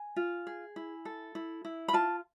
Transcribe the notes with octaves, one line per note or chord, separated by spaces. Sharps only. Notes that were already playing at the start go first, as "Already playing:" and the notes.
Already playing: G#5
F4
G#4
E4
A4
E4
E4
B5
F4 A5